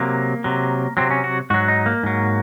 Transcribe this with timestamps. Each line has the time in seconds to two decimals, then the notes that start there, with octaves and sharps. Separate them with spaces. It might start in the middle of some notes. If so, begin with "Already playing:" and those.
Already playing: C3 F#3 A#3
0.44 C3 F#3
0.97 C3 F#3 C4
1.11 C#4
1.24 F#4
1.50 G#2 F#3 F#4
1.68 D#4
1.86 A#3
2.03 G#2 F#3